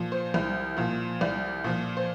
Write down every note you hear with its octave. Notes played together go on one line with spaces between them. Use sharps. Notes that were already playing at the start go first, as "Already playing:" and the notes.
Already playing: A#2 F3
C5
C2
A#2 F3
C2 D5
A#2 F3
C5